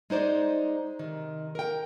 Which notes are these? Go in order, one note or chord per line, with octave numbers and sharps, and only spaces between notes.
G#3 D#4 C5 D5
C3 D#3
A#4 G5